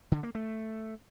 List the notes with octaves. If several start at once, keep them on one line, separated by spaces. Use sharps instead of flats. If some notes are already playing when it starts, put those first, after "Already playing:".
D3
A#3
A3